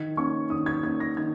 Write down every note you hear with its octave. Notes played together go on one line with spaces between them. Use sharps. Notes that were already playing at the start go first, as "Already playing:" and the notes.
Already playing: D#3 G#6
A#3 C#4 C#6
D#3 D#6
G#6
A#3 C#4 G#6
A#6
D#3 G#6